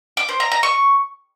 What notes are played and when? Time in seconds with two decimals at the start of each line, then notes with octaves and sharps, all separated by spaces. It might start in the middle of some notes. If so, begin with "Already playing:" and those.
0.17 D6
0.29 C5
0.40 A#5
0.52 A#5
0.63 C#6